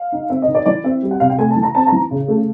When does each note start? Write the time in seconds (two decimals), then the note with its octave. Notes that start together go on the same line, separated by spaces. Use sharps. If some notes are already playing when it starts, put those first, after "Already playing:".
Already playing: F5
0.12 D#4
0.30 C4 E5
0.42 D#5
0.48 D#3
0.55 D5
0.66 E3 D5
0.84 C4 E5
1.03 G3
1.11 F#5
1.20 C3 F5
1.30 G5
1.38 A3 G#5
1.51 A5
1.56 E3
1.63 A#5
1.75 C4 A5
1.87 A#5
1.92 E3
2.11 C#3
2.28 A3